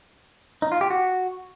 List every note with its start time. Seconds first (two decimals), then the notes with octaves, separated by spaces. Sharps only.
0.62 D#4
0.72 F4
0.81 G4
0.90 F#4